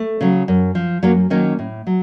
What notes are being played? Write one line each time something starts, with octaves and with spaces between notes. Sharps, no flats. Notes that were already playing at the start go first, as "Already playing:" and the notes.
Already playing: A3
C#3 F#3
F#2
F3
F#2 F#3 A#3
D#3 F#3 A#3 C#4
A2
F#3